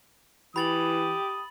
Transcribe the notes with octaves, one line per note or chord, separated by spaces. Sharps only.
E3 G4 B5 D#6 A6 F#7